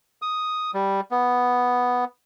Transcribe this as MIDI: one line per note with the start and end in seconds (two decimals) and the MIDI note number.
0.22 0.71 87
0.74 1.01 55
1.11 2.05 59